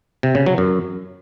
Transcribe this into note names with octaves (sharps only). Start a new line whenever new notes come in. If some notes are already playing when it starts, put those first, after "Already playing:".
C3
C#3
F#3
F#2